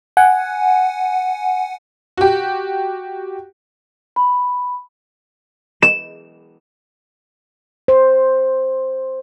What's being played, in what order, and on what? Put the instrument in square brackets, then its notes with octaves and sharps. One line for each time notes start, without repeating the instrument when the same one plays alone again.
[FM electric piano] F#5 G#5
[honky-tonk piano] F#4 G4
[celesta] B5
[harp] E7
[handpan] C5